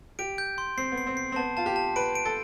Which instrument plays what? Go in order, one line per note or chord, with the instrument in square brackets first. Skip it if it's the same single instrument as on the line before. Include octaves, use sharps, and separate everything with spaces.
[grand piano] G4 [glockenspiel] D7
[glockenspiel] G6
C6
[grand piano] C4 [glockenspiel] C7
[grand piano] B3
[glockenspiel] C7
[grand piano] C4
[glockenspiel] C7
[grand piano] C4
[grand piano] B3 [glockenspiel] A5
[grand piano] F4 [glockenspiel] A5
[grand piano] G4
[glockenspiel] A5
[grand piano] B4 [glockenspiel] D7
[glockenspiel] D7
[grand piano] A4